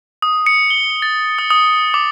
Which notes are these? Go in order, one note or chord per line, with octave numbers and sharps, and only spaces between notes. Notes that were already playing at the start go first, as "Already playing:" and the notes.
D#6
C#7
G7
A6
D#6
D#6
D6